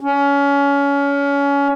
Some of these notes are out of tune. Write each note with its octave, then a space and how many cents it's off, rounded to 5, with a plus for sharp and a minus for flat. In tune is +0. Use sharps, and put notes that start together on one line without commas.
C#4 +25